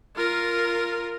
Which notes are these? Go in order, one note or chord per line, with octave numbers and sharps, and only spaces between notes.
F4 A#4